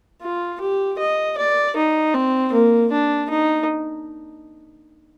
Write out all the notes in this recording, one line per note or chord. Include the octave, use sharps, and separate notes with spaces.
F4
G4
D#5
D5
D#4
C4
A#3
D4
D#4